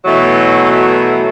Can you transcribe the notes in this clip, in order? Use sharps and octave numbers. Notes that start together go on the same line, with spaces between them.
B2 E3 F#3 A3